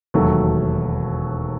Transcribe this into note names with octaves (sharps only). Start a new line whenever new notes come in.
E1 D#2 D#3 F#3 A3